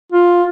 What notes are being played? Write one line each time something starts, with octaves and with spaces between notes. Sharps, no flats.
F4